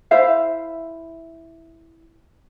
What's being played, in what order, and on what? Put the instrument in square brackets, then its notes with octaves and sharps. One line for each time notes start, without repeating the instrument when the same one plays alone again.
[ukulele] E4 C5 E5 F5